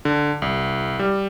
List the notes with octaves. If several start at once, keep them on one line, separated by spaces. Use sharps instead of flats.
D3
C2
G3